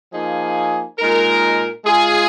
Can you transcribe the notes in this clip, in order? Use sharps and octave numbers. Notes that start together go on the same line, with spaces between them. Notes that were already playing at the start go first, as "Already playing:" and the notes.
F3 A#3 D#4 G#4
A#2 G#3 D#4 A#4
G#3 F4 G#4